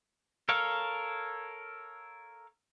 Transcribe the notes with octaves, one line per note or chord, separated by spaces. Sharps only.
A4 A#4 C#5 F5